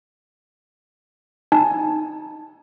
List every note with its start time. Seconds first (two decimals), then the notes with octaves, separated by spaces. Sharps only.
1.52 D#4 G#5 A5